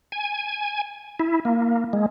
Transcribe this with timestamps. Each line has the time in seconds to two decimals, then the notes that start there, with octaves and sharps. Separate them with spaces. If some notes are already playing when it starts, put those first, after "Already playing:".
0.12 G#5
1.20 E4
1.45 A#3
1.93 G#3